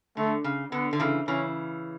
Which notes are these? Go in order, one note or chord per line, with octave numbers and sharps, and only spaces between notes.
D3 A3
C#3
D3 B3
D3
C#3 E3
C#3 E3 C#4